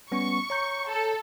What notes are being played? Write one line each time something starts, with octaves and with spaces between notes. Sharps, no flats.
G3 B3 C#4 C#6
C#5 A#5 G6
A4